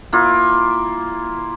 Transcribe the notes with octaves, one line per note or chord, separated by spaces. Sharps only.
A#3 E4 F4